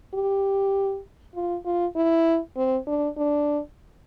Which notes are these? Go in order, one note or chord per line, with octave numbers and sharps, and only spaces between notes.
G4
F4
F4
E4
C4
D4
D4